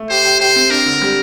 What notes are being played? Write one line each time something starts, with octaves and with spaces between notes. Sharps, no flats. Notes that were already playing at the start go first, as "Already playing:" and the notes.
Already playing: A3
G4 C5
G4
G4 C5
C4
D4 A#4
D3
G3